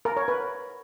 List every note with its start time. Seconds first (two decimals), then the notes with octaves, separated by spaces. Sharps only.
0.05 A#4
0.17 C#5
0.28 B4